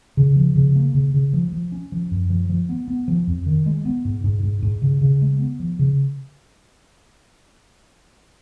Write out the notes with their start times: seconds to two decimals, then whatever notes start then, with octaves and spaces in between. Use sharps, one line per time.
0.17 C#3
0.36 F3
0.55 C#3
0.76 A#3
0.94 C#3
1.14 C#3
1.33 F3
1.52 F3
1.72 C#4
1.92 F3
2.11 F#2
2.30 F3
2.50 F3
2.69 B3
2.88 B3
3.08 F3
3.27 F2
3.46 D#3
3.66 G#3
3.85 B3
4.05 G#2
4.24 G#2
4.43 G#2
4.62 G#2
4.82 C#3
5.01 C#3
5.22 G#3
5.40 B3
5.60 F3
5.79 C#3